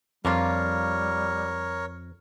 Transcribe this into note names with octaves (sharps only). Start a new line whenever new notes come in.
F2 G3 A#3 D4 F4 A#4 C#5